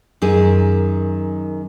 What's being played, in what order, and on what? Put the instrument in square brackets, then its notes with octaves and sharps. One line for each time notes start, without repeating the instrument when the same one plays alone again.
[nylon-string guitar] F#2 D#3 G#4